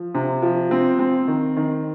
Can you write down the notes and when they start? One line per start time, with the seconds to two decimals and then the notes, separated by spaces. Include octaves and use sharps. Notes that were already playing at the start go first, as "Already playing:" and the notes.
Already playing: F3
0.15 C3
0.43 F3
0.71 C4
0.99 C4
1.28 D#3
1.57 D#3